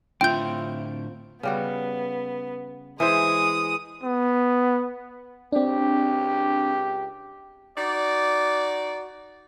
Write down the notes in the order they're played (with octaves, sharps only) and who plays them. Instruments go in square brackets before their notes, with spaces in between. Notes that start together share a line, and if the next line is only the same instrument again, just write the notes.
[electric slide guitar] A2 D3 E5 [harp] C4 F4 [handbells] G5 G6
[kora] C#3 G3 F#4 [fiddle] B3
[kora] E3 E4 C5 [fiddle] G#3 D#6
[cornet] B3
[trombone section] C#2 G4 [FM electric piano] C4 D4
[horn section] D#4 F#4 D5